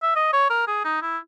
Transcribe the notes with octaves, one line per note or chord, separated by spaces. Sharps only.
E5
D#5
C#5
A#4
G#4
D#4
E4